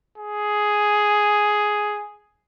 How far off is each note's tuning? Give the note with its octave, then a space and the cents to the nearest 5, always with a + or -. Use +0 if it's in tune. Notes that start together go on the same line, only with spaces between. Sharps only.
G#4 +5